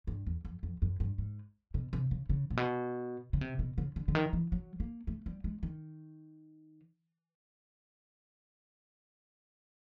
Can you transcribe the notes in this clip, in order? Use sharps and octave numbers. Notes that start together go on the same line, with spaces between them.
G2
E2
F2
F2
F#2
G2
G#2
B2
C3
C#3
C#3
A#2
B2
C#3
C3
B2
C#3
D3
D3
D#3
E3
F#3
A#3
A3
G3
G#3
D#3